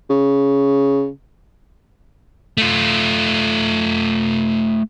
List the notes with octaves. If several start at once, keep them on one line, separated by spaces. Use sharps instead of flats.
C#3
A3 F4